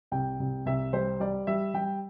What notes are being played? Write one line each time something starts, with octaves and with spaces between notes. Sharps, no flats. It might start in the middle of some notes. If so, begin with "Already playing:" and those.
C2 G5
C2
C2 E5
G3 C5
G3 D5
G3 E5
G3 G5